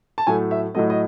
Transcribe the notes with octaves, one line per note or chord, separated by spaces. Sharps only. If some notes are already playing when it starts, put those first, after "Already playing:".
A5
A2 F#3 A3 G#5
E5
A2 F#3 A3 D#5
D#5